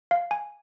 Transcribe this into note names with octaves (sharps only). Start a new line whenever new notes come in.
F5
G#5